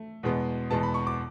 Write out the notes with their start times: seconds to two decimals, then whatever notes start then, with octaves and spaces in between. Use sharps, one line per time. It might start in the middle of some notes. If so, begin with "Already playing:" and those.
Already playing: A3
0.23 E2 B2 G#3 B3
0.70 E2 B2 G#3 B3 A5
0.83 B5
0.94 C#6
1.07 D6